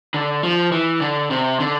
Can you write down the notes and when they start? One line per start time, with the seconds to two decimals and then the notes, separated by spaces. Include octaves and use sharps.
0.14 D3
0.43 F3
0.72 E3
1.01 D3
1.31 C3
1.60 D3